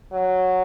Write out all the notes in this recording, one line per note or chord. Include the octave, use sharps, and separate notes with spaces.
F#3